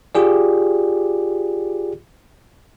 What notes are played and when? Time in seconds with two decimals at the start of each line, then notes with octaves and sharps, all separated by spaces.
0.15 F4 G4 G#4 D5